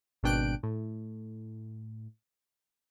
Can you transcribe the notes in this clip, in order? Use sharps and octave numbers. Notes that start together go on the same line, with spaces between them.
G#1 B2 D4 G5 F#6 D7
A2